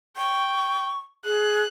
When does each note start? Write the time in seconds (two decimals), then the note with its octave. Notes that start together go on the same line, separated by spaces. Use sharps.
0.17 G5 C#6
1.25 G#4 F#6